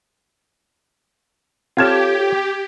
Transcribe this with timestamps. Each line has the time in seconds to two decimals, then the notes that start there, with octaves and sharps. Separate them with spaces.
1.77 C4 F4 G4 A4 C#5 G#6 E7